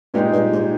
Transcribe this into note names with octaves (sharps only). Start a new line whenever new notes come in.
G2 A#2 G#3 D#4 G4
G2
G#2